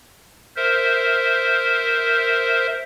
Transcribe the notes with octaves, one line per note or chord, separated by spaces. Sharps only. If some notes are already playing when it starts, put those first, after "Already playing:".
A#4 C5 E5